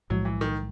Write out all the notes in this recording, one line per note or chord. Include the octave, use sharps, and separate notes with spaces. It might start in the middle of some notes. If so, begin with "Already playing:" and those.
B1 A2 F3 F#3 G#3
E3
D#3